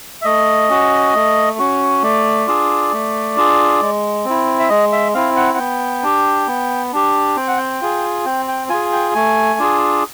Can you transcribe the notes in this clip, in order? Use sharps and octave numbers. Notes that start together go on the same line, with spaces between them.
E5
A3 D#5
C#4 F#4
A3
C#4 F#4
A3 D5
D4 F4 G#4
A3
D4 F4 G#4
G#3
C4 E4
E5
G#3 D#5
E5
C4 E4 F5
F#5
F#5
B3 G5
D4 G4
B3
D4 G4
C4 G5
F#5
G5
F4 G#4
C4 G5
G5
F4 G#4 G#5
G5
A3 G#5
D4 F4 G#4